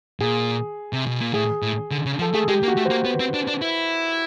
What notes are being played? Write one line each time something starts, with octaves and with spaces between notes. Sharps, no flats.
A#2 G#4
C3
B2
A#2
A2 G#4
A2
D3
C#3
F3
A4
A3 G#4
G#3 G4
A#3
F#4
A3
A#3 C5
B3 B4
C4
D4
D4
E4